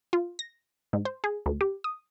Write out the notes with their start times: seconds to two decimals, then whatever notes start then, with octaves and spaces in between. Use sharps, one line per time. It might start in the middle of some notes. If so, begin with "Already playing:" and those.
0.13 F4
0.39 A#6
0.93 G#2
1.05 C5
1.24 G#4
1.46 D2
1.61 G4
1.84 D#6